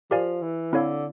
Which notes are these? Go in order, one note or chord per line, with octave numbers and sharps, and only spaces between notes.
F3 G4 A#4 D5 F5 G#5
E3
D3 C4 E4 A4 C#5 F5